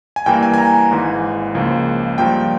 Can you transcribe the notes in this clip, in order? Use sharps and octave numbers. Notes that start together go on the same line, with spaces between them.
G#5
G2 E3 A#3 G5
G#5
G#5
A#5
G#1 G#2 E3
C#2 C#3 F3 A#3
G2 F3 A#3 G5